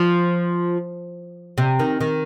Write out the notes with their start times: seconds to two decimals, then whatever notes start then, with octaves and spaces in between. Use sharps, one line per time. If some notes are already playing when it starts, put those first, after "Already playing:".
Already playing: F3
1.58 C3
1.79 D#3
2.01 D#3